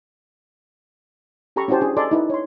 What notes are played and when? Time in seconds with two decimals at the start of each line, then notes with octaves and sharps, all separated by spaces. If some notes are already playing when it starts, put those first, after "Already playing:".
1.56 C#4 G4 A4 A#5 B5 C#6
1.68 C#4 E4 F#4 G4 C5 A5
1.81 D4 G#4
1.97 A4 D5 D#5 G#5 C6
2.11 D#4 E4 B4
2.30 C#5 C6